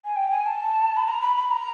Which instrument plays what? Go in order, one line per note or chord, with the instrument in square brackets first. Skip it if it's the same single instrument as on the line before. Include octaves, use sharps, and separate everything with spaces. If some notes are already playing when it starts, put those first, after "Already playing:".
[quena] G#5
G5
G#5
A5
B5
A#5
B5
B5
A#5